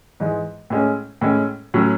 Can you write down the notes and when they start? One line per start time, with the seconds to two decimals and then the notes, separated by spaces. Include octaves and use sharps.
0.20 G#2 E3 G#3
0.70 A2 G#3 C#4
1.21 A2 G#3 C#4
1.74 A2 F#3 C#4